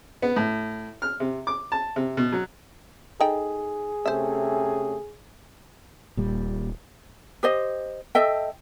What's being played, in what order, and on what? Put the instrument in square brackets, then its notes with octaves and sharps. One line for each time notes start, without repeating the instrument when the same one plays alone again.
[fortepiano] B3
A2
F6
C3
D6
A5
C3
B2
F#3
[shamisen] D#4 A4 G5 [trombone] G#4
[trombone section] C3 A3 C#4 [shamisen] C5 E5
[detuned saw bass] D#1 [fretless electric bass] A#2 G3
[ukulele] G4 C5 D#5
A4 D#5 E5 G5